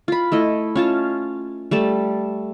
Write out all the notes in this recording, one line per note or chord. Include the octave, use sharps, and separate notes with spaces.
F4 B5
A3 E4 D#5
C#4 F4 A5
G3 A3 A5